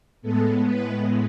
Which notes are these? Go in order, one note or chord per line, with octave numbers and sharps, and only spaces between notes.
A2 G#3 B3 A4
B4